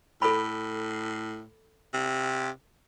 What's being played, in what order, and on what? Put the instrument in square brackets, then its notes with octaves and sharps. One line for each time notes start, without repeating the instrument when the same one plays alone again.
[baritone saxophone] A2 [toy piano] A4 B5
[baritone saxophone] C3